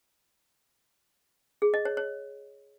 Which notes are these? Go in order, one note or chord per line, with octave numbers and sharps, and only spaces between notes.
G#4
D#5
C#5
C#5